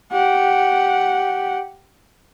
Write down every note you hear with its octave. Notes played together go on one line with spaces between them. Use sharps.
G4 F#5